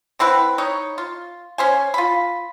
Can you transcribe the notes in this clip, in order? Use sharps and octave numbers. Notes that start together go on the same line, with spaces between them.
D3 C4 E4 B4
D#4 C#5
F4
C#4 C5 G#5
F4 B5